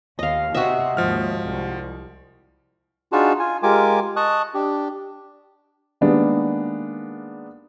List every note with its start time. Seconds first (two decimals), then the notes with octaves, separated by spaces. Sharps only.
0.19 D#2 D#5 F5
0.55 C3 F#4 D#5 E5
0.97 D#2 G#2 F3 F6
1.42 C2
3.12 D4 D#4 F4 F#4 G#4 A5
3.40 F4 G#5
3.63 G#3 F4 G4 A#4 G#5 D6
4.16 D#5 A5 C#6 D#6 F#6
4.54 D4 G4
6.01 D#3 G3 G#3 A#3 B3 D4